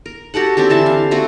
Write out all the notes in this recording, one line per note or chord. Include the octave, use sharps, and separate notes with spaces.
A#4
F#4 G4 A4 F#5
C4 D4 G4 A4
D3 E3 E5 A5
F5
A3 C4 F#4